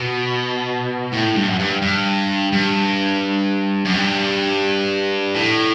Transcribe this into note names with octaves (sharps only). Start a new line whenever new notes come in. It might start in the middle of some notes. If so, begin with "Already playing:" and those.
Already playing: B2
A2
G2
F#2
G2
G2
G2
F#2
G2
A2